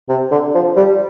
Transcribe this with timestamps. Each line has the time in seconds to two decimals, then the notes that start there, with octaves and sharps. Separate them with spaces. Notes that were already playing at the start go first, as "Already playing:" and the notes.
0.09 C3
0.31 D3
0.54 F3
0.76 G3